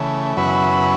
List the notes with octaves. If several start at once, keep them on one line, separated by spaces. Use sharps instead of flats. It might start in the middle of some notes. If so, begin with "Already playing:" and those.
Already playing: C#3 E3 A3
F#2 C#3 F#3 B3 E4 B4